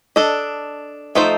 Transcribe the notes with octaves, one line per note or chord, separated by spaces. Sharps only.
D4 A4 D#5
F3 A3 D#4 A4 C5